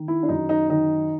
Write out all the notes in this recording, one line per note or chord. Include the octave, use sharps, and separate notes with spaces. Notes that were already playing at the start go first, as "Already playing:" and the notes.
Already playing: D#3
E4
D4
F#2 D#4
D#4
D#3 D#4